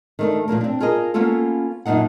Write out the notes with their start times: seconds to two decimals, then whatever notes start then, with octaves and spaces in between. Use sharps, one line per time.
0.19 D#3 A3 D4
0.48 A#2 F3 A#3 A#4
0.61 C4 D4
0.80 F4 G#4 A#4 D#5
1.14 A#3 B3 C#4 F4 A4
1.86 F#2 A#2 D4 D#4 F#5